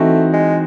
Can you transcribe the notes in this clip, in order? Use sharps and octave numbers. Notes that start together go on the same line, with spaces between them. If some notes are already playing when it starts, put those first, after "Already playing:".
Already playing: E3 A3 C4 D#4 F#4
G#3